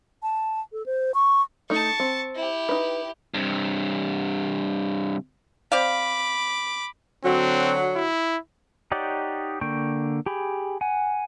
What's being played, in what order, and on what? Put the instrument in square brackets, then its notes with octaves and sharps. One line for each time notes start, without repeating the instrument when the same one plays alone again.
[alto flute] A5
A4
C5
C#6
[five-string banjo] A3 D#4 [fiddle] A5 C#6
[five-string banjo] C4
[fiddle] E4 G4
[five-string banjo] D#4 B4
[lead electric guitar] G2 C3
[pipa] C4 D5 F5 [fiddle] B5 D6
[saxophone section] D3 F#3 [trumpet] C4
[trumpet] E4
[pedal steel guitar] D#4 G4 C#5 D5 F#5
D3 A#3 G5 C#6
G4 G#4 B5
F#5 G#5